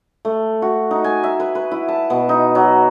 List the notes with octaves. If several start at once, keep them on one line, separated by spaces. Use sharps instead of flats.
A3
F#4
D#4
G#5
E5
B4
B4
E4
A5
B2
D#4
F#3